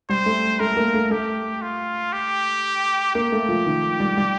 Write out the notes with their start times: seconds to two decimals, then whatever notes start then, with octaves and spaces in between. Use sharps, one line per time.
0.09 G3 C5
0.26 A3
0.60 A3 A#4
0.77 A#3
0.94 A3
1.11 A3 G4
1.62 F4
2.13 G4
3.15 A#3 G4
3.32 A3
3.49 F3
3.66 D#3
4.00 G3
4.17 G3